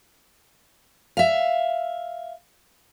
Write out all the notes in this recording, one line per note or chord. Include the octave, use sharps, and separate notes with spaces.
E5 F5